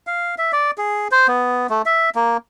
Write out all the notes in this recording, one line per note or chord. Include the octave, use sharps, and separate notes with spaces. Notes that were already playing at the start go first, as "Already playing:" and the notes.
F5
E5
D5
G#4
C5
B3
A3
E5
A#3